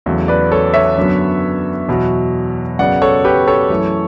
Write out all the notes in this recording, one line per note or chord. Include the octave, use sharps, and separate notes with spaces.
E2 C#3 F#3 A3
B4 D5
A4 C#5
C#5 E5
F#2 D3 F#3 B3
E2 B2 F#3
F#2 C#3 F#3 B3 D5 F#5
A4 C#5
G4 B4
A4 C#5
F#2 E3 A3